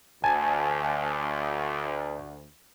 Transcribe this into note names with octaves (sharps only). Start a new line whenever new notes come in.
D2 G#5 A5